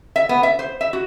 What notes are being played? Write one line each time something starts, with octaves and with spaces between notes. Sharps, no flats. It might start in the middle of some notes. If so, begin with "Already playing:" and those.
E5
B3
E5
C5
E5
F#4